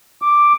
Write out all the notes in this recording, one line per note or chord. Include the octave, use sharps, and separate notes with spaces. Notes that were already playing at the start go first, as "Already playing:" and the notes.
D6